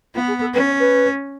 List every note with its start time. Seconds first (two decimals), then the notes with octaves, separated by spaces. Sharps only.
0.14 B3 F4
0.28 G#4
0.41 A4
0.54 C#4 B4
0.66 C#5
0.79 B4